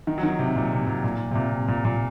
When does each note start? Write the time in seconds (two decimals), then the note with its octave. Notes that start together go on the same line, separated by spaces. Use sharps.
0.07 D#3
0.18 F#3
0.23 D#3
0.39 C3
0.56 A#2
0.72 C3
0.87 A#2
1.04 A#2
1.31 C3
1.35 A#2
1.52 C3
1.68 A#2
1.85 A#2